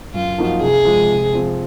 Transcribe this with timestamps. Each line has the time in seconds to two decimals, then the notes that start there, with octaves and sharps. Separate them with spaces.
0.14 F#2 F4
0.38 F3 A#3 D#4 F#4
0.62 C3 G#4
0.85 F3 G#3
1.10 C3
1.33 F3 C4